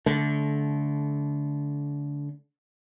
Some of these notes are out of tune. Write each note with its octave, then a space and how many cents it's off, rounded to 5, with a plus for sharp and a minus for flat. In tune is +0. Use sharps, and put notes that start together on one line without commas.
D3 -25 A3 -30